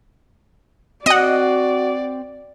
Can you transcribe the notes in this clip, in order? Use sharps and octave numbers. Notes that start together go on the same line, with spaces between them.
C4 F#4 D5 D#5 F#5 F#6